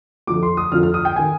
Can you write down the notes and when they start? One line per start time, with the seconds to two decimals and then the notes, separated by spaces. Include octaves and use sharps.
0.27 F2 D3 F3 D6
0.43 C6
0.57 D#6
0.72 F2 D3 F3 F6
0.83 F6
0.94 D#6
1.05 G5
1.16 D#3 G#5